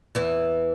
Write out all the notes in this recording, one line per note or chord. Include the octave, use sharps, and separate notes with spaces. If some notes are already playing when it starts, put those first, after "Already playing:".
E2 E3